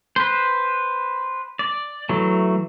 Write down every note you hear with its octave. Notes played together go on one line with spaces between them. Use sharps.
B4 C5
D5
E3 F#3 A3